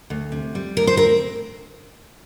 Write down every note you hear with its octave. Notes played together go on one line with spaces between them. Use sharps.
D2
C3
G3
D2 A#4
C5
C4 A#4